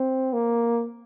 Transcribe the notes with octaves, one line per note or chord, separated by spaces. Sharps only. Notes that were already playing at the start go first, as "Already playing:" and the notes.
Already playing: C4
A#3